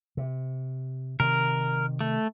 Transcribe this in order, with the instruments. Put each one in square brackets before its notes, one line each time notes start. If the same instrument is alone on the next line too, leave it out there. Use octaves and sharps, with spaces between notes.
[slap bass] C3
[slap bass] C3 D#3 [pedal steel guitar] A#4
[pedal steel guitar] A3